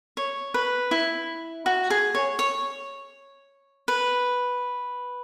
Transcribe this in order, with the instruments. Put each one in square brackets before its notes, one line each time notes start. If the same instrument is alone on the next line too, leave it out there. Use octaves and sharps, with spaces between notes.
[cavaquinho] C#5
B4
E4
F#4
G#4
C#5
C#5
B4